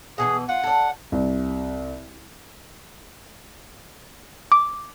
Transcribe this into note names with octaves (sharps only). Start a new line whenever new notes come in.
B2 D#3 E3 G#4
F4 F#5
A4 D5
C2
D6